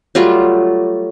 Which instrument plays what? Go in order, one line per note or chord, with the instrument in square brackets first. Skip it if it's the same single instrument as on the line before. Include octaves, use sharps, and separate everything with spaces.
[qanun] F#3 G3 A3 F4